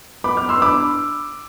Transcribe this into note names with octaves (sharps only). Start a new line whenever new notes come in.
B3 B5 D6
B3 D6 F6
C6 E6
D4 B5 D6